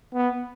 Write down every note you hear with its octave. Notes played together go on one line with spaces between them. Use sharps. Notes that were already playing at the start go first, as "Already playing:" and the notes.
B3